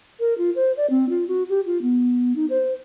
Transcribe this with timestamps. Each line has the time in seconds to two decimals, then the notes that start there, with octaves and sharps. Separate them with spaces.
0.20 A#4
0.38 F4
0.55 C5
0.77 D5
0.90 C4
1.09 F4
1.28 F#4
1.49 G4
1.66 F4
1.82 B3
2.36 D#4
2.50 C5